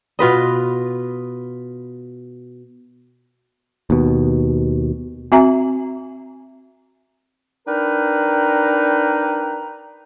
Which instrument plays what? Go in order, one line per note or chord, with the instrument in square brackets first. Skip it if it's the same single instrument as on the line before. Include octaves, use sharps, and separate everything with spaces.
[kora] B2 F4 B4 D#5
[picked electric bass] D#2 B2
[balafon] C4 F#4 E5 G#5 A#5
[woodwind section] D4 D#4 A#4 B4 G5 A#5